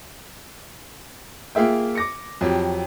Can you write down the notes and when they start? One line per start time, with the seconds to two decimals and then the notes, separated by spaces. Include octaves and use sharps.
1.55 A#3 F4 G#4 E5 G5
1.95 D6 A#6 C#7
2.41 F2 F#3 G4